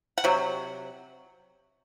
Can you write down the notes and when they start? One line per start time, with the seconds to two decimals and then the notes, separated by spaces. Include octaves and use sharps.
0.18 F#5
0.24 C3 F#3